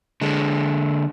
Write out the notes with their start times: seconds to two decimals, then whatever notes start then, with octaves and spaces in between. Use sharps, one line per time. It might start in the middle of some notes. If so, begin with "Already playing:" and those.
0.21 D3 G#3